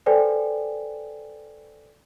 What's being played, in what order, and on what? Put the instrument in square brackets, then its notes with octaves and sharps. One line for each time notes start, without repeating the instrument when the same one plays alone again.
[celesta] A4 B4 C5 D5 G5 G#5